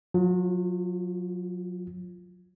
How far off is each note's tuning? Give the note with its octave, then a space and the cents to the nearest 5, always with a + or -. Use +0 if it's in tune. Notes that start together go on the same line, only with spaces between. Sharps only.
F#3 -35 F4 +0